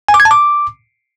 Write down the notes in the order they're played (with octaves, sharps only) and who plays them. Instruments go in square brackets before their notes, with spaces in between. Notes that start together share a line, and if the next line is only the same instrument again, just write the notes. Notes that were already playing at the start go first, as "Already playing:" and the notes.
[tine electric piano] G#5
D6
G#6
A5
D6